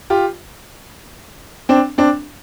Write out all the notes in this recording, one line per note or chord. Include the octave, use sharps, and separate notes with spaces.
F4 G4
C4 D4
C4 D4